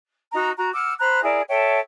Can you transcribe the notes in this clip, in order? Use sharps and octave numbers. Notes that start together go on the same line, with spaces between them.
D#4 F#4 A#5
F#4 A#5
F#5 D6 E6 F6
C5 A#5 B5 F#6
E4 G#4 A#4 D5
A4 C#5 E5 G5